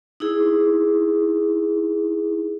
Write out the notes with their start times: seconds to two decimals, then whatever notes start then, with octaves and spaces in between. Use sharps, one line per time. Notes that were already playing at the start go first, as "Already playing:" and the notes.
0.20 D#4 E4 G#4